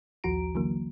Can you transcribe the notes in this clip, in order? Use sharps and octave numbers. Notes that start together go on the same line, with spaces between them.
A#1 D#2 F3 F#4 A#5 D7
D3 E3 F#3 A#3